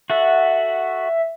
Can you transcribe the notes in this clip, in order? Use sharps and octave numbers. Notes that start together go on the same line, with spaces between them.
F#4 A4 E5 F#5